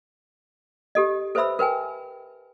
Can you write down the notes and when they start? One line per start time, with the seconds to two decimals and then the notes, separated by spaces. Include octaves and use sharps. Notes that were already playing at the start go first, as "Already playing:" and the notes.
0.95 G4 A4 D#5
1.35 A4 B4 C5 E5 B5 E6
1.59 A#4 B4 G5 G#5